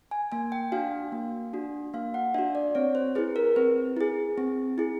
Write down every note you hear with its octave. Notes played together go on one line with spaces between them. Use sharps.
G#5
A#3 G#5
G5
D4 F#4 F5
A#3
D4 F#4
A#3 F5
F#5
D4 F#4 E5
D5
C4 C#5
C5
E4 G#4 B4
A#4
C4 B4
E4 G#4
C4
E4 G#4